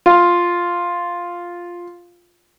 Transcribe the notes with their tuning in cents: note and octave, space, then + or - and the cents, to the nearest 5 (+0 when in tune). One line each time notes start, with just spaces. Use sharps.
F4 +0